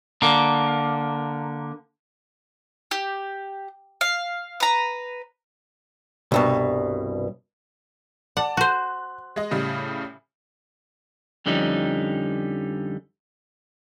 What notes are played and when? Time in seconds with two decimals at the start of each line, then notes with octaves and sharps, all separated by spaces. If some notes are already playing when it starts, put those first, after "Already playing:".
0.22 D3 A#3
2.91 G4
4.01 F5
4.60 B4 A#5
6.32 C2 G2 B2
8.37 D5 F#5 A5
8.57 F#4 C5 F#6
9.36 G#3 D#5
9.51 A2 C#3 G3
11.46 F2 D3 F3 G3 C#4 D#4